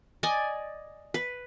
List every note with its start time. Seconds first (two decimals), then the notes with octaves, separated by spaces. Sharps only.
0.23 D5 D#5 G#5
1.14 B4